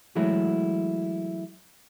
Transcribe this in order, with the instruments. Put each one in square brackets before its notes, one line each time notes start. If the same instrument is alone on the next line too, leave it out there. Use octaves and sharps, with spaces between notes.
[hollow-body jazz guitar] E3 F#3 G#3 A3 E4 F#4